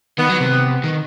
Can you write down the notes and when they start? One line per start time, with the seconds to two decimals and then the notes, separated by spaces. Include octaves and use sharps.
0.18 D#3 B3
0.29 F#3
0.40 C3
0.51 C3
0.84 D#3